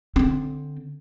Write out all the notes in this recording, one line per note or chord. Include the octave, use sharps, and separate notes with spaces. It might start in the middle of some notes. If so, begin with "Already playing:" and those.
D3 C4